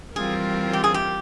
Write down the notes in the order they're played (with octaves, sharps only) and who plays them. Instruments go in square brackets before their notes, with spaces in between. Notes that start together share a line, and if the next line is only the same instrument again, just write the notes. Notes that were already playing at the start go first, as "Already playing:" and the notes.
[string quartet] E3 G3 C4 F4 A#4 [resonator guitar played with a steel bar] G#4
[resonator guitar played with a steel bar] G4
G#4
G4